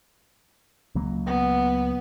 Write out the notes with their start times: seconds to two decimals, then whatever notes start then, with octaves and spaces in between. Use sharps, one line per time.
0.95 C#2 F#3 A#3
1.27 B3